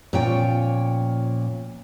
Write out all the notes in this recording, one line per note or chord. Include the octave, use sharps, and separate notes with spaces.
A#2 F3 C#4 C#5 G5